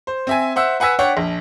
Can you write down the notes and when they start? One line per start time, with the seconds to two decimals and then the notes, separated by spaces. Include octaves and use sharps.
0.07 C5
0.27 C4 E5 G#5
0.56 C5 E5 F#5 E6
0.80 B4 F#5 G#5 E6 B6
0.99 D4 C#5 D5 F#5 G5
1.17 A#1